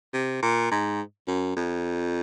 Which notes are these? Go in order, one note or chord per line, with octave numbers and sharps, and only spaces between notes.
C3
A#2
G#2
F#2
F2